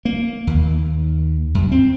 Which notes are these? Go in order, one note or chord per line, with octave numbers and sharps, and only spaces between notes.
A#3
D#2
F#2
C4